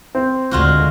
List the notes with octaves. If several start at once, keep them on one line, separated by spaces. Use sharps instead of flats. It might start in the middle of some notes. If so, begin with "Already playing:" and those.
C4
D2 G#3 F4 F#4